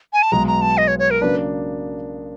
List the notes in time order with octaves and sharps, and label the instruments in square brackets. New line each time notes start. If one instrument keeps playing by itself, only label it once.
[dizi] G#5
A5
[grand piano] B1 B2 G#3 [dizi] A#5
[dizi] A#5
A5
D#5
C#5
C#5
A#4
[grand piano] C#3 F#3 A#3 D4 [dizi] B4